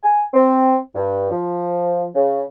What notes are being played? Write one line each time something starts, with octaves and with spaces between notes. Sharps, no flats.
G#5
C4
G2
F3
C#3